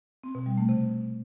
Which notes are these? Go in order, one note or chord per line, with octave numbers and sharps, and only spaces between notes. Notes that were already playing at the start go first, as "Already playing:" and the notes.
C4
B2
G3
A3
C3